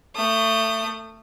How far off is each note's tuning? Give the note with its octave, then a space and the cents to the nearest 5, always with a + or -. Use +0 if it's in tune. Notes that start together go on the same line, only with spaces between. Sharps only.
A3 +25 D#6 -25